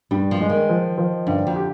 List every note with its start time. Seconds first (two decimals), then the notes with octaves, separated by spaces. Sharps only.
0.11 G2 G3
0.31 F3
0.41 G#3
0.49 D#3
0.69 F3
0.98 F3
1.27 G2 D3
1.47 F2
1.56 G4